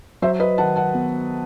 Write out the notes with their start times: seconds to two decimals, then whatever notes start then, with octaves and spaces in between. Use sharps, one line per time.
0.22 F#3 C5 E5
0.40 B4 D#5
0.58 D#3 F#5 A5
0.76 F#5 A5
0.94 B3